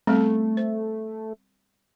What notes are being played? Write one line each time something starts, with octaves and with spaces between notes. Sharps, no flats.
G3 A3 B3 C4
C5